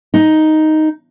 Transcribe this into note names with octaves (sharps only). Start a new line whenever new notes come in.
D#4